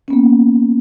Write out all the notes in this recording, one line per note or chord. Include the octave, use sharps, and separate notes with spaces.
A#3 B3 C#4